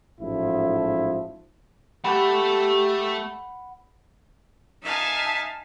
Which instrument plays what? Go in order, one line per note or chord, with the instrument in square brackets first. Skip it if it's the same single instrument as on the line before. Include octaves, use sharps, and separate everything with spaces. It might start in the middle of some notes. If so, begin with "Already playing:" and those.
[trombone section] A1 G#2 F3 E4
[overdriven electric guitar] A3 A4 [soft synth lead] G4 [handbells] F#5 B5
[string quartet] D#4 E5 F5 G#5 A5